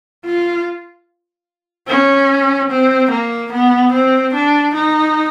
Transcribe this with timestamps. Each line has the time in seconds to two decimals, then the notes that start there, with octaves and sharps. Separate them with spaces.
0.25 F4
1.88 C#4
2.70 C4
3.11 A#3
3.53 B3
3.93 C4
4.34 D4
4.75 D#4